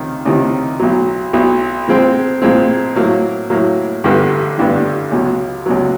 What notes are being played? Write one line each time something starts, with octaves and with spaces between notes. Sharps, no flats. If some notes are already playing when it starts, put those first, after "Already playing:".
Already playing: C#2 C3 D#3
C#2 C3 D#3
B1 B2 F#3
B1 B2 F#3
A#2 F3 G#3 C4
A#2 F3 G#3 C4
A2 F#3 A#3
A2 F#3 A#3
A1 G2 D3 G3 B3
A1 G2 D3 G3 B3
C#2 B2 F#3
C#2 B2 F#3